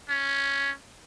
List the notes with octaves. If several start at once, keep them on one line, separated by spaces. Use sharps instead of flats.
C#4